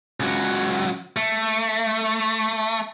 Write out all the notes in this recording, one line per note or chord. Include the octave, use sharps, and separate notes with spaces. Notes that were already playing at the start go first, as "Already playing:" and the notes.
C#2 F#3
A3